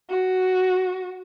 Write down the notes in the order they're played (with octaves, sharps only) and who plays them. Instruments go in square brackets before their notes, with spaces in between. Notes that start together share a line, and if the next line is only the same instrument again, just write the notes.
[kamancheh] F#4